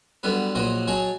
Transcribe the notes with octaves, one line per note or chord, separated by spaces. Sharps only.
D3 F#3 G3 B3 B4
A#1 A#2 F#3 F#4 D#5 D#6
F#3 G#4 C#5 D#5 A5